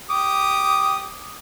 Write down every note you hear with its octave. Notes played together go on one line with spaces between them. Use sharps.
G4 D6 D#6